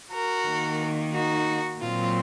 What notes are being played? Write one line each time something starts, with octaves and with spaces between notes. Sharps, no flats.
F#4 A#4
D#3 A#3
D#4 F#4
A#2 F#3 C4 F4